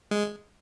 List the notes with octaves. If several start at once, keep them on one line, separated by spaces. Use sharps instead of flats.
G#3